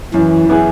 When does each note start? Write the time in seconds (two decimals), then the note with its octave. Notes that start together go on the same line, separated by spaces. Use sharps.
0.14 F#2 E3
0.49 E3 B3 E4 G#4